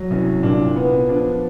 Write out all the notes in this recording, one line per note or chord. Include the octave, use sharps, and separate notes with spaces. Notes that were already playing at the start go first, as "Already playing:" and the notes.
Already playing: F#3
C2 C#4
A#2 D4
B3
F3 D4